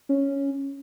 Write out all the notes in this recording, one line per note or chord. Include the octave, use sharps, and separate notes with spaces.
C#4